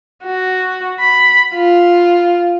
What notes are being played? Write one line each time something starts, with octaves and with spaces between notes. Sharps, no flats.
F#4
B5
F4